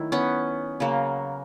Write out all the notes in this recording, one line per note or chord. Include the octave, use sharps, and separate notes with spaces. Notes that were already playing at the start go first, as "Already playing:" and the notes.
Already playing: D#3 F#3 A3 E4
B3 C#4
C#3 F#3 A#3